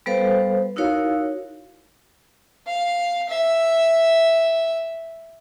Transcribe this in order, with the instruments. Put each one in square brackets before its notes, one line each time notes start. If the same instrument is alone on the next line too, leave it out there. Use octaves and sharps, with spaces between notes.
[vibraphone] G3 B3 A4 B4 C5 F5
D#4 E4 F#4 A#4 C#5 F5
[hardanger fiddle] F5
E5